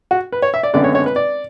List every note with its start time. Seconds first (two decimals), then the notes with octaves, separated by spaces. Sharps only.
0.11 F#4
0.32 B4
0.42 C#5
0.54 E5
0.63 D5
0.73 G#1 F#2 D3 G#3 B3 D5
0.84 C#5
0.95 C#5
1.06 B4
1.16 D5